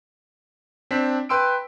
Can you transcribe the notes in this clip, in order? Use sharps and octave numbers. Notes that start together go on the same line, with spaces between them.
C4 D4 B6
B4 G5 C6 E6 D7